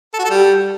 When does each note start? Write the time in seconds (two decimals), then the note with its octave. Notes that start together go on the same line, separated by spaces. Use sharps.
0.14 A4
0.19 F#4
0.24 A4
0.30 G3